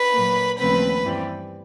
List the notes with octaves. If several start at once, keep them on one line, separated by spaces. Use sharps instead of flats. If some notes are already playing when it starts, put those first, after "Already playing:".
Already playing: B4 B5
A#2 F#3 A#3
D#2 C#3 F3 A3 C4 B4 B5
G2 E3 G3 C4